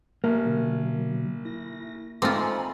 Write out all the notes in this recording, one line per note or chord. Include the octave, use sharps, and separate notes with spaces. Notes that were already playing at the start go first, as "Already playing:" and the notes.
A1 A#3
B2 D3 F#3
E4 A#6
G#2 A3 C4 F4 G#5 A#5 B5 D6